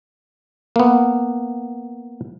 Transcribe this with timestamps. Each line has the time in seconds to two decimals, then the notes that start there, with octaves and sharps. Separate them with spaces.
0.76 A#3 B3